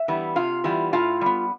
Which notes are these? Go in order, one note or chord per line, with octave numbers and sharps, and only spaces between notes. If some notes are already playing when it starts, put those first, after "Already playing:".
Already playing: E5
E3 G3 B3
C3 F4 F5
E3 G3 B3
A2 F4 F5
G3 B3